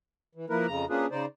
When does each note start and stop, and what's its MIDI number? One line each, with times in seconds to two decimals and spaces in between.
0.35 0.46 52
0.50 0.66 53
0.50 0.66 58
0.50 0.66 64
0.50 0.66 70
0.50 0.66 71
0.67 0.85 41
0.67 0.85 49
0.67 0.85 82
0.90 1.06 58
0.90 1.06 61
0.90 1.06 62
0.90 1.06 65
0.90 1.06 68
0.90 1.06 71
1.11 1.25 49
1.11 1.25 63
1.11 1.25 72
1.11 1.25 74